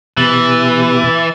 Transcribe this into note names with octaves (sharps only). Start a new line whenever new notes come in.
B2 E3 B3 G4 A6